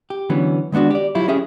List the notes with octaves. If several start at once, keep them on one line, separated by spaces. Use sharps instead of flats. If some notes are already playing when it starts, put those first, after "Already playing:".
G4
D3 E3 F#3 B3 C#4
D#3 G#3 B3 D4 F#4
G4 D5
F#3 E4 F4 G4
C#4 G4 G#4 E5